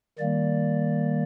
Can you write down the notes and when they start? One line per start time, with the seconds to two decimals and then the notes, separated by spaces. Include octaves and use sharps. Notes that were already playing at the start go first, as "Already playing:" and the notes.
0.19 D#3 G3 A#3 D5